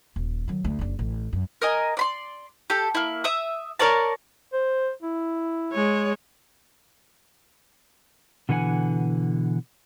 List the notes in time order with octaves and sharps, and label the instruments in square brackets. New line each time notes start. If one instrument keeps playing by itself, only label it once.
[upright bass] D#1
D#3 F#3
D2
F#1 D4
A1
F#2
[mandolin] A#4 D#5 G#5
D5 B5 C6
G4 A4
A#3 E4
E5 D#6
A#4 C#5 D5 A5
[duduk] C5
E4
[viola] G#3 C#5
[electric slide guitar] B2 D3 E3 F4 F#5 G#5